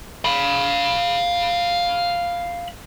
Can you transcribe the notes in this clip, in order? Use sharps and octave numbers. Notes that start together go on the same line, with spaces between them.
F5 B5